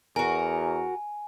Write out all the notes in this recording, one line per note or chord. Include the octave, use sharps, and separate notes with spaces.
E2 F#4 A#4 G#5